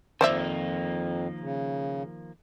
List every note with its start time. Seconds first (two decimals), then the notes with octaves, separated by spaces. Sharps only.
0.21 F2 D#3 F3 A#3 C5 D5 E5
1.40 C#3